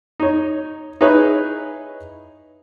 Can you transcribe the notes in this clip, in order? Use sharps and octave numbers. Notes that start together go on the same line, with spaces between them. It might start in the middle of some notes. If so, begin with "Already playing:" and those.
D#4 C#5
D#4 E4 G#4 B4 C#5